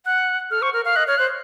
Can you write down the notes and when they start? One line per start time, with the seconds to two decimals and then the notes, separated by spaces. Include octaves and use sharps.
0.06 F#5 F#6
0.51 A4 F6
0.62 C5 C#6
0.73 A#4 F6
0.85 F5 F6
0.96 D#5 F#6
1.07 C#5 F6
1.18 C5 F#6